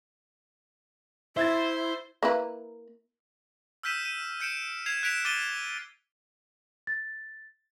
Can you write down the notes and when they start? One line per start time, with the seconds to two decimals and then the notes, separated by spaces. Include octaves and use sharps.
1.37 E4 C5 E5 G#6 A6
2.23 A#3 E4 B4
3.83 E6 F6 G6 B6 D#7 E7
4.05 D#7
4.40 G6 C#7 D7 E7
4.86 G#6 C7 E7 F7
5.03 F#6 G#6 B6 D7 E7 F7
5.25 D6 A6 D#7 G7
6.87 A6